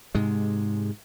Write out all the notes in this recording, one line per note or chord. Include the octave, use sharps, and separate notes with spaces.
G#2 C3 G#3